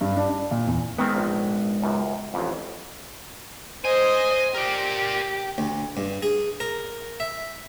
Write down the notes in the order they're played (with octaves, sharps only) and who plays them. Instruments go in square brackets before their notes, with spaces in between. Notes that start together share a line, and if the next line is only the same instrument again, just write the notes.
[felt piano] G2
D4
D4
A#2
E2
[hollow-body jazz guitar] G#2 B3 [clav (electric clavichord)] D#3 C4
[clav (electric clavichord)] A#1
C#2 F#2
A1 F2
[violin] C5 D#5 [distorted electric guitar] G#5
[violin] G4 [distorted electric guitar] A#4 D5
[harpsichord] D2
G2
G#4
A#4
E5